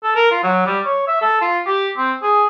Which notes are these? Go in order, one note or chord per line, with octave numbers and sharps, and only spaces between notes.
A4
A#4
F4
F#3
G3
C#5
E5
A4
F4
G4
C4
G#4